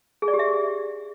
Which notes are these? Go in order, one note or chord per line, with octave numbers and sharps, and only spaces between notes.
G#4
D5
G4
E5